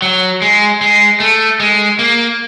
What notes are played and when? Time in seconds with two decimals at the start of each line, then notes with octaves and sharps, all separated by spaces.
0.02 F#3
0.42 G#3
0.81 G#3
1.20 A3
1.60 G#3
1.99 A#3